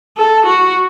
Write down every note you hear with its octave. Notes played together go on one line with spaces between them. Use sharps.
A4
F#4